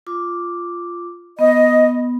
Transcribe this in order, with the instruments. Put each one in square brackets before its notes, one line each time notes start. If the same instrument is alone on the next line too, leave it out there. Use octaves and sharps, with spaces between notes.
[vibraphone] F4 D6
[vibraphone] B3 [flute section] D#5